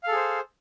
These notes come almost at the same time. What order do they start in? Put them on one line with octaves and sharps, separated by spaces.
F5 A4 G#4 C5